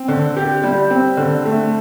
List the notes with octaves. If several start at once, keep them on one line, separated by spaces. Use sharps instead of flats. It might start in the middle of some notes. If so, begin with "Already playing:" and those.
Already playing: C4
D3
G4
G3
C4
D3
A3